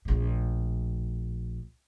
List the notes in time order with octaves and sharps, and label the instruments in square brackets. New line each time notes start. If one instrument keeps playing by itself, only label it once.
[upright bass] A#1 A2